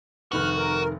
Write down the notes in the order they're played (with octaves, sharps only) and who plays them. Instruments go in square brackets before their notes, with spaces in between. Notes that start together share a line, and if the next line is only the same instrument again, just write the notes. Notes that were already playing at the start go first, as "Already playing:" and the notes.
[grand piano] F1 D#3 B4 [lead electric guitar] F#4 [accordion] F6 F#6
[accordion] A#4